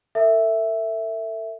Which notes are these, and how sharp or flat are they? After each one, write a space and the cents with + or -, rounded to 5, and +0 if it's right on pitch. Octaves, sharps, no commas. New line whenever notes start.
A4 +40 E5 +0